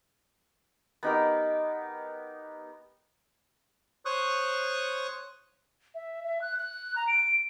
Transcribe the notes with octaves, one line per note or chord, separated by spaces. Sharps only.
B3 D#4 G4 A#4
C5 C#5 C#6 D#6 F#6
E5
E5
F#6
F#6
A#5
D7